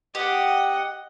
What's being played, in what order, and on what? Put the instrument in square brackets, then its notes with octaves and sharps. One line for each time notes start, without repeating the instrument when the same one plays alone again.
[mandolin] G4 [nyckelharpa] D#5 F#5